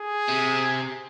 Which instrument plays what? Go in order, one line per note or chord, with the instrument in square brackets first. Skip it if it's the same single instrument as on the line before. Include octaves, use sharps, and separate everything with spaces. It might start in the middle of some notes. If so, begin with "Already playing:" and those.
Already playing: [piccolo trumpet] G#4
[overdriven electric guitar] C3